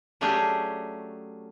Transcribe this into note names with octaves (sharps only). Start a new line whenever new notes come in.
F#3 A3 C#4 D4 G4 G#4